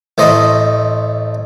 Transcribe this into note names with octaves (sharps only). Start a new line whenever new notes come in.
A1 A3 C5 D#5